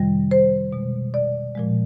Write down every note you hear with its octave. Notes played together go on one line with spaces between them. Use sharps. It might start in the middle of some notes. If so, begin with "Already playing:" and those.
Already playing: F2 C3 D#3 G3
C5
B2 G#3
D5
A#2 F3 G#3